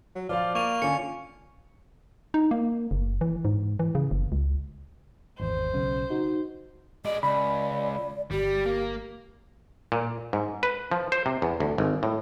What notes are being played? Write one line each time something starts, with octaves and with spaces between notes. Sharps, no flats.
F#3
F3 F4 C5 D5 F5
A#3 C#6 D#7 F7
D3 C#4 F4 C#6 C#7
D#4
A#3
F#1
E3
G#2
E3
C#3
F#1
C#2
G#1 E2 C5
B1 C#3
D#4 F#4
G#3 D5 D#5
C#2 D5 B5
G1 G3 G4
A#3
A#2
G#2
B4
F3
C5
C3
E2
D2
G#1
A2